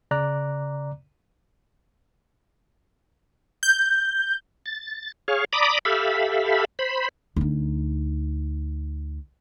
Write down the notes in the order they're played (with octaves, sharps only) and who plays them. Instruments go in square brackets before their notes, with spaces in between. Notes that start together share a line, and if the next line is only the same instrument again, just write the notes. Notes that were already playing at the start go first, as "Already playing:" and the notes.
[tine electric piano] C#3 D5 A#5 D6 F#6
[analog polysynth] G6
[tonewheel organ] A6
G#4 C#5 F5
D5 A#5 B5 D6 D#6
G4 A4 E5 F5 B5
C5 B5
[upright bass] D2 D#4